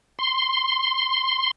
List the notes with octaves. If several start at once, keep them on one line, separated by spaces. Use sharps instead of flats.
C6